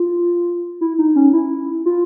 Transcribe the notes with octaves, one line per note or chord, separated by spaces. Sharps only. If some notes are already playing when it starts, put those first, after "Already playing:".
Already playing: F4
E4
D#4
C#4
E4
F4